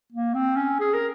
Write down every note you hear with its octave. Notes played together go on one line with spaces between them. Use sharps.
A#3
C4
C#4
G#4
A#4